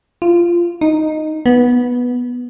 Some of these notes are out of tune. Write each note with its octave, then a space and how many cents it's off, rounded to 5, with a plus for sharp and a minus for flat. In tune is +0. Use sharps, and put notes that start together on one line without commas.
F4 -15
D#4 -5
B3 -10